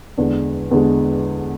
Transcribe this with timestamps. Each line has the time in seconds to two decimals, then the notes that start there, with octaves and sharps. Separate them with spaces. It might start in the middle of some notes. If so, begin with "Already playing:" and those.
0.18 E2 D3 G#3 D4
0.71 E2 D3 G#3